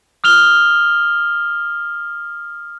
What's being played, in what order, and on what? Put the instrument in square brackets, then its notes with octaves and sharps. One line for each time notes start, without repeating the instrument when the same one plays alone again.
[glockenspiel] D#6 F6 F7 G7